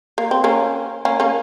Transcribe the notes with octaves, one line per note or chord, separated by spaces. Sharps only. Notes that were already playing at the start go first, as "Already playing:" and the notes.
A#3
C4
A#3 C#4
A#3 C#4
A#3 C#4